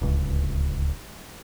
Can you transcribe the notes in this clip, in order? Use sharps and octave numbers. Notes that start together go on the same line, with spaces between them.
D1 C#2